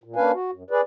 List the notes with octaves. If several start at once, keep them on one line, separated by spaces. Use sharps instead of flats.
A#2
A#3 C#4 D4 B4 F5 G#5
F#4
F#2
G#4 B4 D5